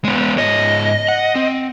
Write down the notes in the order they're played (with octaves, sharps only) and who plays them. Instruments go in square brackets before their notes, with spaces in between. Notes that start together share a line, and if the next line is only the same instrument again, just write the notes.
[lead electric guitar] G#3 B3
[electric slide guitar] G#2 C#5 [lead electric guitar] D#5
[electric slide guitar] F#5
C4